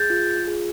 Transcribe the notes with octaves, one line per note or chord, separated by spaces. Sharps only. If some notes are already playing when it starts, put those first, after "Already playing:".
Already playing: G#4 G6 A6
F4
G#4